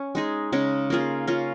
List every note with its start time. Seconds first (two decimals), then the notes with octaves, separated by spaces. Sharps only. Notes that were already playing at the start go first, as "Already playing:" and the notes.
Already playing: C#4
0.15 G#3 D#4 G#4
0.53 C#3 G#3 C#4
0.90 A#3 F4 G#4
1.27 A#3 C#4 F4